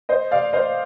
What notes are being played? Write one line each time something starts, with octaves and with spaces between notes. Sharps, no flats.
C5 D#5
D5 F5
C5 D#5